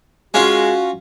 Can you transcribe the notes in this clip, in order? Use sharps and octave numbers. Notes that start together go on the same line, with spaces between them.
G#3 C#4 F4 F#4